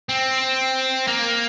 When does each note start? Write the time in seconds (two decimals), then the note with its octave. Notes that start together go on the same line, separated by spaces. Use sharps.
0.09 C4
1.07 A#3